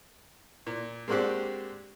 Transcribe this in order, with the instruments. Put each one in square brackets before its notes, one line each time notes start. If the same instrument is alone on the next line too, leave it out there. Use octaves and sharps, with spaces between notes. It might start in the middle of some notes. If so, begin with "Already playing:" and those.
[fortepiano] A#2
G#3 A#3 C4 D4 F#4 G4